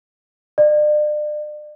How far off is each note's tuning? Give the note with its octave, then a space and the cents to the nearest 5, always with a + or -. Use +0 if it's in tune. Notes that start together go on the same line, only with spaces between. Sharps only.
D5 +40